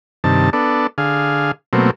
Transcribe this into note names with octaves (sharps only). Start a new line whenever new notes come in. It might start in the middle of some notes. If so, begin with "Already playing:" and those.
G2 C3 D#3 A5
B3 D4 A4
D3 G#4 F5
B2 F#3 A3 A#3 C4